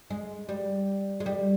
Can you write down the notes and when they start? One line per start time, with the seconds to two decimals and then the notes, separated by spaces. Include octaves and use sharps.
0.10 G#3
0.49 G3
1.20 G#3
1.26 G3